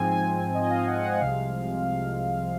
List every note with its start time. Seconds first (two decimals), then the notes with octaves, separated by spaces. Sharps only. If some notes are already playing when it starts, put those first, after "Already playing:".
Already playing: G#2 F3 C4 G#5
0.11 G#5
0.54 D#5
0.65 D#5
0.70 F5
0.87 F#5
1.04 F#5
1.20 C2 C3 F3 G#3 F5